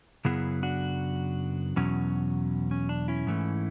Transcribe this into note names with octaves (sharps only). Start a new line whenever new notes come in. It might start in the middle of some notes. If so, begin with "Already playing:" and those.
F#2 C#3 F#3 B3 E4 G#4
D4 F#4
E2 B2 F#3 C#4
C#4
D4
C#4 E4
G#2 E3 A3